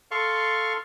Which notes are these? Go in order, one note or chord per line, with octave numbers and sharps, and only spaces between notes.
A4 F5 C6 C#6